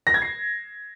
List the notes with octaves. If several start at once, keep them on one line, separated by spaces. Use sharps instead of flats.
A#6
G#6
C7